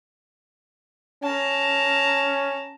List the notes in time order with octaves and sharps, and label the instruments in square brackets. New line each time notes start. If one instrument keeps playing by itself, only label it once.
[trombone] C#4 [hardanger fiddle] A5 A#5